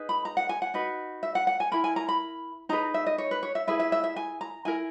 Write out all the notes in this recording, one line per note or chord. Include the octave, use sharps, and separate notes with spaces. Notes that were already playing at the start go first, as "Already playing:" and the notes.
Already playing: D#4 G#4 B4
B5
A#5
F#5
G#5
F#5
D#4 F#4 B4
E5
F#5
F#5
G#5
E4 A#4 B5
G#5
A#5
B5
D#4 G#4 B4 A#5
E5
D#5
C#5
B4
C#5
E5
E4 G#4 B4 E5
E5
E5
E5
G#5
A#5
E4 A#4 G#5